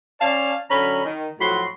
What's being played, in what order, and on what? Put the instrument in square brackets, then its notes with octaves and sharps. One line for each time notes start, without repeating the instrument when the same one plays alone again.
[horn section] C#4 D5 F5 A5
D3 F#3 C#4 A#5 B5
D#3
A2 F3 F#3 F#4 B5 C6